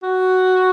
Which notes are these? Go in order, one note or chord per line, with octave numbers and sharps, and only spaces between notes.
F#4